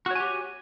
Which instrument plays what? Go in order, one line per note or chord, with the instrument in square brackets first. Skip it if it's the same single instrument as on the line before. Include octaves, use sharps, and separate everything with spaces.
[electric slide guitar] F#4
C#5
G#5
G4